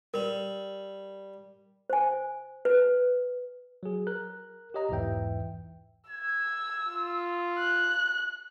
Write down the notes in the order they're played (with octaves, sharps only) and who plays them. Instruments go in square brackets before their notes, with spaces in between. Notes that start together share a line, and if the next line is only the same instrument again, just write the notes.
[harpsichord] G3 [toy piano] A#4
[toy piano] C5 G#5
B4
[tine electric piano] F#3 G#4
A#4 F#6
G4 C#5 D#5 A#5
B1 E2 G#2 E3 E5 G5
[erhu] E6 [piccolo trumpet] G#6
[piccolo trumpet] F4
[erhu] F#6